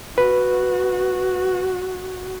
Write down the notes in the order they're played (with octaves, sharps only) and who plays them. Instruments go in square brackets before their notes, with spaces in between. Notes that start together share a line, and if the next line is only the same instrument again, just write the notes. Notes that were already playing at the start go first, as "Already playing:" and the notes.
[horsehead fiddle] F#4 [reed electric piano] B4